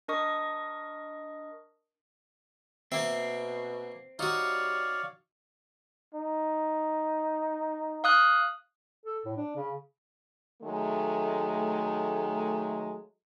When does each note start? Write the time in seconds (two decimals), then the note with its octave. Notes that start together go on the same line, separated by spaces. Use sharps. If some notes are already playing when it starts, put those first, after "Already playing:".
0.08 D4 A#4 D#5 C#6 D#6
2.92 B2 A#3 C4 E5
4.19 G3 D#4 F#4 C#5 D5 F5
6.14 D#4
8.04 F5 D#6 F#6
9.06 A4
9.25 A2
9.37 D4
9.56 C#3
10.62 D#3 F#3 G#3 A3